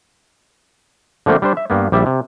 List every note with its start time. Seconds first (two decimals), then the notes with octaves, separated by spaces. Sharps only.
1.26 D3 F3 A3 A#3 C4
1.42 G3 D4 C5
1.57 E5
1.70 G2 A#3 B3
1.92 A#1 G3 D5 E5
2.06 C3